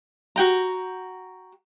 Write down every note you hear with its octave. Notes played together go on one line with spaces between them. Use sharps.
F#4 G5 A#5